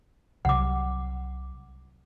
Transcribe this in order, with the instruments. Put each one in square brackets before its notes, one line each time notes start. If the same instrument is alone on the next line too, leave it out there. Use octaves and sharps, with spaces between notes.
[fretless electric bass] C2 C3 F#3 [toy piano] F#5 D6